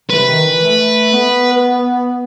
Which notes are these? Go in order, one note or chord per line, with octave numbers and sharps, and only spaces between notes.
C3 B4
D#3
E3
A3
B3